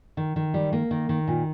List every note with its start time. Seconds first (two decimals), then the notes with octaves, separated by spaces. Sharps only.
0.17 D#3
0.36 D#3
0.54 G3
0.73 A#3
0.91 D#3
1.09 D#3
1.28 A#2